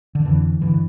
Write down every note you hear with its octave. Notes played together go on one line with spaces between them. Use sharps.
D3
F2 D3 E3
G2 D3 E3